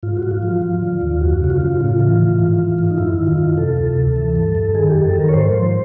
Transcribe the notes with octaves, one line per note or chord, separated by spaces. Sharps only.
G#2 F4
F#4
G#2
F4
F3
F3
D3
D#2
F#2 F#4
C#3 F#4
F4
C#3
A2 F4
E3
E3
G#2
E3
G#2
D#4
F#2 E4
D#3
F4
F#2
C3 A4
D2
D2
E3
G2
G2
D#3 G#4
F#2 G4
A4
D#3
A#4
C#5
G#2 C5
F3